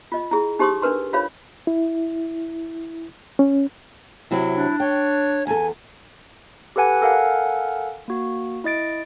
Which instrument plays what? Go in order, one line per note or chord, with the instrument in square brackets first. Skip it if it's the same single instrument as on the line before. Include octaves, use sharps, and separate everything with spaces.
[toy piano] F4 D#5
E4 G#4
D#4 G4 C5 C6 C#6 D#6
D4 A#4 B4 C6
F4 C5 C#5 F5 B5
[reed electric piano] E4
C#4
[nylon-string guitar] C3 F#3 C4 [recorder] E4
[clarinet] D4
[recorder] C#5 [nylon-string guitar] G5
[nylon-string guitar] E2 A4 [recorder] G#5
[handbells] G4 A4 B4 F#5 G#5
A4 A#4 F5 F#5 G#5
A#3 F#4
E4 D#5 A6 D7